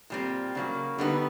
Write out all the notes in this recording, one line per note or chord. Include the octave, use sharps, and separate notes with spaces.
A#2 G3 C4
C#3 F#3 A#3
D3 G3 B3 D#4